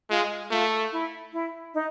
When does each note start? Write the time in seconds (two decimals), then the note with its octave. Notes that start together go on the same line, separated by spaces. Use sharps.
0.10 G#3 F4
0.50 A3 F4
0.92 E4
1.33 E4
1.74 D#4